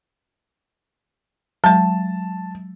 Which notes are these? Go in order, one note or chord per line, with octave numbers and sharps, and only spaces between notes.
F#3 G#3 A5